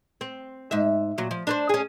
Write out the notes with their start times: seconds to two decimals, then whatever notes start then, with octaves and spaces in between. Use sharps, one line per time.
0.21 C4
0.71 G#2 E5
1.18 A#2 F#3
1.31 F3
1.47 D4 B4 C5
1.69 C#4 G#4